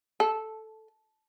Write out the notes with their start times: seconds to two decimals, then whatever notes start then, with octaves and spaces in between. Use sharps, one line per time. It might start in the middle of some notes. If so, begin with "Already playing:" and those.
0.20 A4